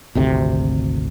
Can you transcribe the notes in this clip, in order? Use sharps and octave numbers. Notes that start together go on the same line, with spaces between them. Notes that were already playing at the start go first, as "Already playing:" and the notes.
G#1 D2 C3